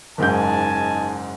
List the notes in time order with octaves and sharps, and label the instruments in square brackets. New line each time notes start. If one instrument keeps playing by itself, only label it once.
[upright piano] F#1 G#2 G6 [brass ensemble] D#4 G#5 A5